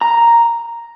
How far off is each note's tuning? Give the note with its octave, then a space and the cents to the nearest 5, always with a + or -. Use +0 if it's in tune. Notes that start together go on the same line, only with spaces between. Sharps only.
A#5 +0